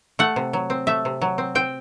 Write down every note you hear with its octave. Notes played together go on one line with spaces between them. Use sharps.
A3 F#5
C3
F#3
C4
A3 E5
C3
F#3
C4
C4 G5